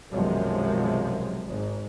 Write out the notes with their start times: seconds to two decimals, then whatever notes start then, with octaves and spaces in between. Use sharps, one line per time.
0.11 B1 F#2 C3 D#3 F3 G#3
1.45 G#1 G#2